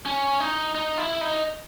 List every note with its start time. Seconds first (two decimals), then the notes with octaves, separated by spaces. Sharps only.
0.05 C#4
0.40 D#4
0.75 D#4
0.98 E4
1.21 D#4